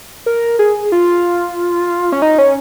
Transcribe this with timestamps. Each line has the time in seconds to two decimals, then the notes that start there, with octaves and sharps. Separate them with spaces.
0.26 A#4
0.59 G#4
0.92 F4
2.12 C#4
2.22 D#4
2.38 C#4